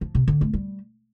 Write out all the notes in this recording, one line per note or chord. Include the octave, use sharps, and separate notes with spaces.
F3
C3
D3
A3
G3